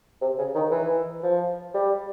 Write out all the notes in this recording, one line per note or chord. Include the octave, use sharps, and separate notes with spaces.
C3
C#3
D#3
E3
F3
G3